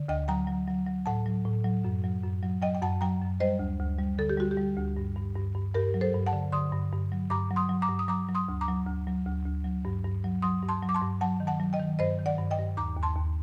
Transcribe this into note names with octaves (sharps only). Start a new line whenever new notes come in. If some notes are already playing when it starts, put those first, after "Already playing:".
Already playing: D3
D2 D#5 G5
F#3 G5 A#5
F#3
F#3
F#3
A2 F#5 A5
F#3
A2
F#3
F#2
F#3
F#2
F#3
F#3 D#5 G5
G5
F#2 F#5 A5
F#3 G5 A#5
F#2
G3 C5 D#5
D2
D2
G3
D3 A4
G4
G3 F#4
G4
G3
D2
G2
G2
G2
G2
G2 G4 A#4
F#3
A4 C5
G2
F#5 A5
D3
D3 C6 D#6
G2
G2
F#3
G2 A#5 D6
F#3
C6 D#6
F#3
A#5 D6
G2
D#6
F#3 A#5 D6
F#3
C6 D#6
D2
A#5 D6
F#3
D2
F#3
D2
D2
F#3
G2
G2
F#3
F#3 C6 D#6
G2
A5 C6
F#3
D6
A5 C6
G2
F#3 F#5 A5
D#3
F#5 A5
F#3
D#5 G5
D#3
G2 C5 D#5
D#3
D5 F#5
G2
D#5 G5
G2
D#2 A#5 D6
D#2
A5 C6
D#2